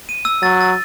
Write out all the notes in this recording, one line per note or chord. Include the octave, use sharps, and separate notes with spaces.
D#7
E6
F#3 A6
A6